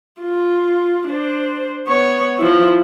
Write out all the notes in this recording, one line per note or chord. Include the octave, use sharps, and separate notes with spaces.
F4
D4 C5
B3 C#5
F3 E4